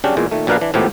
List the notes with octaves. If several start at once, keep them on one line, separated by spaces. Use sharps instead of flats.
C#3 F#3 C#4 D4 G4
E2 A#2 G#3
A#2 D#3 A3
A#1 B2 D4 A#4 B4 F5
E3 D4
G#1 A2 F3 A#3 B3 G4